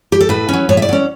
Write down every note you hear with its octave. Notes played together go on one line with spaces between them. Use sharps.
G4
A4
A2 B4
F#3 C#4
A2 C#5
E5
D5
F#3 C#4